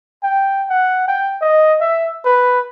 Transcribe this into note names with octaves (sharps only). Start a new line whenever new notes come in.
G5
F#5
G5
D#5
E5
B4